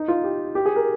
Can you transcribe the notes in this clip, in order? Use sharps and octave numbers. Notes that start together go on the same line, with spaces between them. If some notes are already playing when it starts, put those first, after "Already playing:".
Already playing: D#4
F4
G4
G4
G#4
A#4